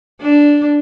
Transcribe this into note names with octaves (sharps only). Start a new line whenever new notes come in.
D4